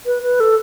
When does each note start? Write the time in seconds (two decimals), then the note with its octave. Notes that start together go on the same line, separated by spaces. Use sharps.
0.06 B4
0.23 B4
0.40 A4